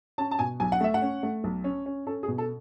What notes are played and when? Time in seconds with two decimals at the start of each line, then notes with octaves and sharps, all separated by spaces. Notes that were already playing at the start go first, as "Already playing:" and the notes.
0.18 C#4 A5
0.31 A5
0.39 B2 G#5
0.60 B1 G#5
0.72 F#5
0.81 A3 E5
0.94 F#5
1.02 C#4
1.23 A3
1.44 B1
1.64 C#4
1.86 C#4
2.07 C#4 A4
2.23 G#4
2.28 B2
2.38 A4